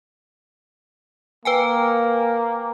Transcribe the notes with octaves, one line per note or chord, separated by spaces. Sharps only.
A#3 B4 G5 G#5